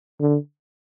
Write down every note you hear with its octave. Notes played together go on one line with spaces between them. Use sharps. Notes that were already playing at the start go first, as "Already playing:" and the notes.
D3